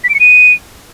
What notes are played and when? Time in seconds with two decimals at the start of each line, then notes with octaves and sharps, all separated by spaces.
0.04 B6
0.09 D7
0.14 C#7
0.20 D#7